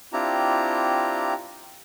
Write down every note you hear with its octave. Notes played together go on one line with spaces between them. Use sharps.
C4 D4 E4 F4 G4 A#5